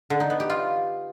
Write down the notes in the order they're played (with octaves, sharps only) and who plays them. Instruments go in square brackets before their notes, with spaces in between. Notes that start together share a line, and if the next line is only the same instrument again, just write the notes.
[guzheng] D3
D#4
B3
G4
F4